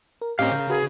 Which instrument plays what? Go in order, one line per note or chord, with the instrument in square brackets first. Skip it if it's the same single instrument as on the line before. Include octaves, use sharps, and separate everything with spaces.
[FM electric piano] A#4
[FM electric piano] A2 D#5 [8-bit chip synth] C4 C#4 G4 [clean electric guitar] A#4 F5
[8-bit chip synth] C#3 [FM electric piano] G6
[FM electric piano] F#4 B4 [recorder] G#4